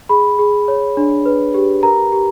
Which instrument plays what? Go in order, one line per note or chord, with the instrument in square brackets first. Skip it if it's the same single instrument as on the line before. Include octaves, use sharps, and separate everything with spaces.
[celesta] G#4 B5
G#4
C#5
D4
B4
G4
A#4 A#5
G4